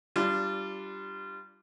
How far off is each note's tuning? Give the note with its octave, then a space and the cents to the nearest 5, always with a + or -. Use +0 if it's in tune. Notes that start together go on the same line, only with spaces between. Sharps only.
G3 -15 D4 +5 F4 -25